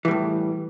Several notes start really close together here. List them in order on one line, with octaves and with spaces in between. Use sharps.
E3 G3 A2